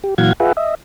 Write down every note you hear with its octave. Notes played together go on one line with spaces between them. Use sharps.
G4
A#2 E3 F#3 F5 F#5 G#6
F4 G#4 B4 E5 F#5
D#5 E5